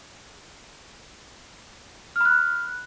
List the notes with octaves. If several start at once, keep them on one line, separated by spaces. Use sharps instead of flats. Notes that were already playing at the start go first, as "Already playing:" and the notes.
B5 F6 F#6